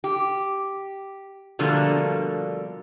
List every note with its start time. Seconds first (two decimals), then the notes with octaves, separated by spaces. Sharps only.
0.04 G4
1.59 B2 D3 F3 G3 A3 A#3